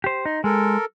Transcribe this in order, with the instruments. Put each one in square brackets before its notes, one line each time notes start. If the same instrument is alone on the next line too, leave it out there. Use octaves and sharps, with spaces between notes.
[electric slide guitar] G4 C5
[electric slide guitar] D#4 [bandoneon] C6
[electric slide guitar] G#3 [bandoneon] A4 A#4